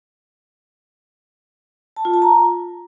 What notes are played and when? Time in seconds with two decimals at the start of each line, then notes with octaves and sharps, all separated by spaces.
1.96 A5
2.05 F4
2.14 A5
2.22 A#5